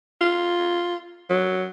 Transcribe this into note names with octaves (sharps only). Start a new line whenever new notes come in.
F4
F#3